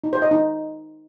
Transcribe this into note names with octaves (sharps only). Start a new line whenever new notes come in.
D#4
C5
D#5
D#4